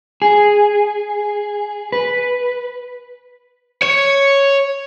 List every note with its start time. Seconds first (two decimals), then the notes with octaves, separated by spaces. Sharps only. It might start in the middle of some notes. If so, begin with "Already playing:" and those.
0.22 G#4
1.92 B4
3.83 C#5